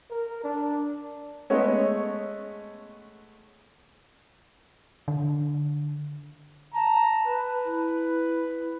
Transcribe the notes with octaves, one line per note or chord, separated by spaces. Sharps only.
A#4
D4
G#3 A3 B3 C#4
D3
A5 A#5
B4
E4